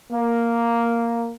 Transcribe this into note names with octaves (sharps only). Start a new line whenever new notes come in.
A#3